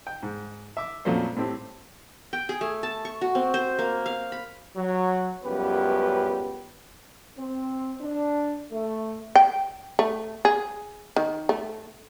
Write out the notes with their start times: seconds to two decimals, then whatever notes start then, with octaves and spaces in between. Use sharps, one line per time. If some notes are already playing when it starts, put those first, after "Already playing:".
0.07 G5
0.23 G#2
0.77 E5 D6
1.05 F2 A#2 F#3 A3 C#4 C5
1.36 A2 A3 C4 G4
2.33 G5
2.49 G#4
2.61 A3
2.83 A5
3.05 C#6
3.21 F#4
3.35 C4
3.54 C5
3.79 A#3
4.06 F5
4.32 B5
4.76 F#3
5.44 C#2 F#2 G3 B3 G4 B4
7.38 C4
8.01 D4
8.72 A3
9.36 G5
9.99 A3
10.45 G#4
11.16 D#3
11.49 A3